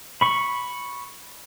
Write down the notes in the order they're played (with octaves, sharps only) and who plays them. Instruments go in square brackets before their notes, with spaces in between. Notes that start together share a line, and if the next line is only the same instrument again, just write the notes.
[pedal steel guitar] B5 C#6